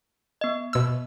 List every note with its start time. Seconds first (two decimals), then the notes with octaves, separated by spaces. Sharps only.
0.41 B3 D#5
0.73 B2 E6